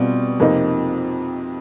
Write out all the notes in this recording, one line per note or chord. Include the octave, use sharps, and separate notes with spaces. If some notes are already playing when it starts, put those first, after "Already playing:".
Already playing: B2 G3 C4 F4
F2 C3 F3 A#3 D#4